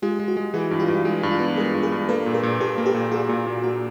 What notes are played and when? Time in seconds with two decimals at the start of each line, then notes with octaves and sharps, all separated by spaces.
0.02 G#3 F4 G4
0.19 G#3
0.28 F#4
0.37 G#3
0.54 E3 F#4 G#4
0.71 G2
0.80 F4 G4
0.88 G2
1.05 G#3 F4
1.23 G2
1.31 F4
1.40 B3
1.57 G#3 G#4 A#4
1.74 G2
1.82 G#4 A#4
1.92 G2
2.09 A#3 A4 B4
2.26 A#2
2.34 G#4 A#4
2.43 A#2
2.60 A#2 G4 A4
2.78 A#3
2.86 G4 A4
2.94 A#2
3.11 A#3 F#4 G#4
3.29 A#2
3.47 A#2
3.63 A#3 F#4